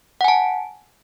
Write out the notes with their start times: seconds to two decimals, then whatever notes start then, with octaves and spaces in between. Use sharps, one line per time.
0.21 F#5
0.24 G#5
0.28 A5